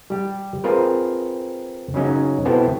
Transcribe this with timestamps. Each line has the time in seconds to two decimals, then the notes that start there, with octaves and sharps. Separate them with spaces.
0.10 G3 G4
0.64 C4 F4 G#4 A#4 B4
1.94 C#3 F#3 C#4 D#4
2.45 B2 B3 C4 E4 G4 A4